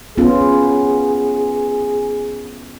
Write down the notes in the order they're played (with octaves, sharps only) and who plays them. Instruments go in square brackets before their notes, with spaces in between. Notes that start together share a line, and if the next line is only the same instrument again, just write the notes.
[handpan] B3 C#4 F4 [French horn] G#4